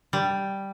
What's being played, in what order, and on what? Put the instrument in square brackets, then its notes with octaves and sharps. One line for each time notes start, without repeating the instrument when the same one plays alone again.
[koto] G3